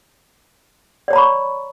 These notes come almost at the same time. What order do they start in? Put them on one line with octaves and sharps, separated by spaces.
D5 C#5 A#5 B5 C#6